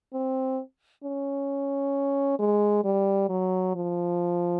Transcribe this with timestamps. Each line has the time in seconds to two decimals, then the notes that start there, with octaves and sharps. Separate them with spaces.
0.13 C4
1.04 C#4
2.39 G#3
2.84 G3
3.29 F#3
3.75 F3